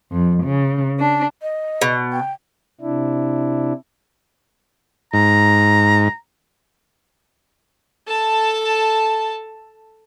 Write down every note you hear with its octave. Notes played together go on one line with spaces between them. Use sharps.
F2
C#3
D4
D#5
B2
G5
C3 D4 E4
G#2 A#5
A4 A5